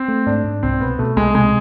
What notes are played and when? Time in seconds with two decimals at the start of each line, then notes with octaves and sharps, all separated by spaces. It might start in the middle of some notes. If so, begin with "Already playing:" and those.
Already playing: C4
0.08 A3
0.26 G#2 D4
0.44 G#2
0.63 C2 C4
0.80 B2 B3
0.99 B2 A3
1.17 C2 G#3
1.35 C3 G#3